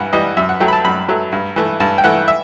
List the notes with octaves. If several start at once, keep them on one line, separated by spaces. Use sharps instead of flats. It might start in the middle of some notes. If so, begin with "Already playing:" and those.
Already playing: G2 E3 F#5
E3 G3 D#5
F#2 E5
F#5
F#3 A3 G5
B5
A5
F#2 B5
F#3 A3
G2
E3 A3
G2 A5
G5
E3 A3 F#5
E5